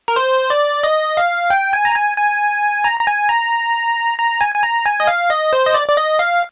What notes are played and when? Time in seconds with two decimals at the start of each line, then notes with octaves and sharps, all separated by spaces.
0.08 A#4
0.16 C5
0.50 D5
0.83 D#5
1.17 F5
1.50 G5
1.73 G#5
1.85 A#5
1.95 G#5
2.17 G#5
2.84 A#5
3.00 A#5
3.07 G#5
3.29 A#5
4.18 A#5
4.41 G#5
4.55 G#5
4.63 A#5
4.86 G#5
5.00 D#5
5.07 F5
5.30 D#5
5.53 C5
5.66 D#5
5.74 D5
5.88 D5
5.97 D#5
6.19 F5